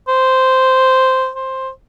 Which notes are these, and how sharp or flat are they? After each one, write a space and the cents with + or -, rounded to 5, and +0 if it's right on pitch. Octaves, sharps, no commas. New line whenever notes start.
C5 -5
C5 +10